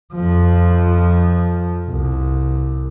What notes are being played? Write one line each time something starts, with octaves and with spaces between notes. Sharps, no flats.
F2 F3
C2